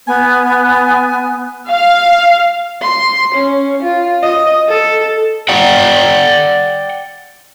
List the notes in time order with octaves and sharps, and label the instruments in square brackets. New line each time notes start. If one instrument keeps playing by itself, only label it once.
[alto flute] B3 [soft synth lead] G#5
[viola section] F5
[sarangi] C6
C#4
F4
D#5
A4
[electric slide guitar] D5 F#5 G5